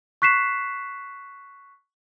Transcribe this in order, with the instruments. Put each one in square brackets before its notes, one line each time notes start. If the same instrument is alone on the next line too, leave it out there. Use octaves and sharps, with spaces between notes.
[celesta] C#6 F#6 B6 C7 E7